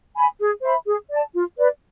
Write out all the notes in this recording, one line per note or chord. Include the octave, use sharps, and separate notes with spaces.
G#5 B5
G#4
C5 E5 B5
G#4
D5 A5
F4
B4 D5